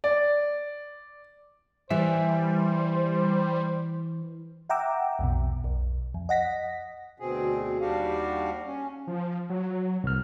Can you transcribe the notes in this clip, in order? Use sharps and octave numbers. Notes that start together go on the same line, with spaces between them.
D5
E3 G3 C5 E5
E5 F#5 G5 A#5 D6 E6
B1 F2 B2
B1
F2
D#5 F#5 A#6 B6
D2 B2 C4 G#4
D#2 G3 D4 F#4 G4 F5
C#4
F3
F#3
C2 F6